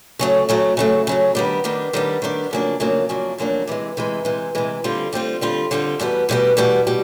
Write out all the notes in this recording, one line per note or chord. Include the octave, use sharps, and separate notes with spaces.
C#3 F#3 A3
C#3 F#3 A3
C#3 F#3 A3
C#3 F#3 A3
D#3 G3 B3 D4
D#3 G3 B3 D4
D#3 G3 B3 D4
D#3 G3 B3 D4
F2 C#3 F#3 A#3 D4
F2 C#3 F#3 A#3 D4
F2 C#3 F#3 A#3 D4
F2 C#3 F#3 A#3 D4
C3 E3 G#3
C3 E3 G#3
C3 E3 G#3
C3 E3 G#3
D3 G3 C4 F4
D3 G3 C4 F4
D3 G3 C4 F4
D3 G3 C4 F4
E2 B2 G3 B3
E2 B2 G3 B3
E2 B2 G3 B3
B2 G3